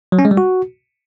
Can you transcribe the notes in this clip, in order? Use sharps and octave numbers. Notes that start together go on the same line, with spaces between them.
F#3
C#4
G#3
G3
F#4